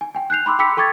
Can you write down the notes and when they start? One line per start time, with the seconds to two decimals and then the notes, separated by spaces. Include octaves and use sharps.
0.01 G#5
0.15 G5 G#5
0.30 F#6 G6 C7 F7
0.46 B5 C6 D6 E6
0.59 G5 B5 D6 E6 B6 C#7
0.77 A4 G5 C#6 D6 G#6 A6